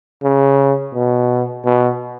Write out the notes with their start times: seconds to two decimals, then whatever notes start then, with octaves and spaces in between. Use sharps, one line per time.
0.24 C#3
0.94 B2
1.65 B2